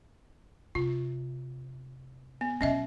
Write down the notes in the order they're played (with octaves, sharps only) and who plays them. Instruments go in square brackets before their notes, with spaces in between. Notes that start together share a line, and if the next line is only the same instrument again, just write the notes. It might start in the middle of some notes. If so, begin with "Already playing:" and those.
[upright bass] C3 [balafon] F4
[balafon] B3
[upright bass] B2 F#3 [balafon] C#4 D#5 E5